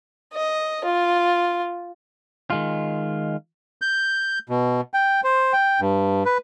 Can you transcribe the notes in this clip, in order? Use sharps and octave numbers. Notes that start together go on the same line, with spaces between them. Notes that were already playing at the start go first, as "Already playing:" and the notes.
D#5
F4
D#3 G#3 F4
G6
B2
G5
C5
G5
G2
B4